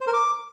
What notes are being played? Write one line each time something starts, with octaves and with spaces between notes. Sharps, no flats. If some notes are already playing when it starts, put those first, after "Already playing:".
C5
A#4
D6